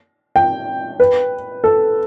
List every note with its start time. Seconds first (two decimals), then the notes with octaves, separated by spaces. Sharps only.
0.36 G5
1.00 B4
1.64 A4